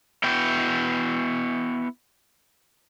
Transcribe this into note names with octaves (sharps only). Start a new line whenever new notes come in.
B3 E4 F#4 G5